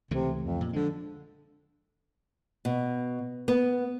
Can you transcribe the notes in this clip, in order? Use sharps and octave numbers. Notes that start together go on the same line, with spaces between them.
C#2 C3 E3 A3
F2
A#2
D3 F3 G#3
B2
B3